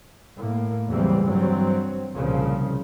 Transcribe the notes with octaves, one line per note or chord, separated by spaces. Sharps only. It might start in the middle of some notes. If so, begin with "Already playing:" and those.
A2 A#3
E2 C#3 E3 F#3 G3 C4
G2 F#3 C4
C2 A#2 C#3 F3